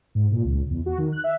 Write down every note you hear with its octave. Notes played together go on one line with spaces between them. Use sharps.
G#2
A#2
C#2
E2
F#4
D#3
F#6
E5